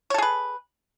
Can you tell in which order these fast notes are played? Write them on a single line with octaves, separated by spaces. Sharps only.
C#5 A4 G#4 B4